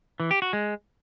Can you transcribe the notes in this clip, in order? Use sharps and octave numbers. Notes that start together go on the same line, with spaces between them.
E3
G4
F#4
G#3